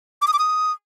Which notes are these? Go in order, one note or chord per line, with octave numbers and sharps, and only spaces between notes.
D6
D#6
D6
D#6